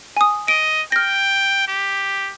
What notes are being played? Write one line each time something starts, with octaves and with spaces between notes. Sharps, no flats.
G#5 D#6
D#5 D7
G5 F6 A#6
G4